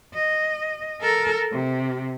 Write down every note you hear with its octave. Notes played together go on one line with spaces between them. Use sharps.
D#5
A4 A#4
C3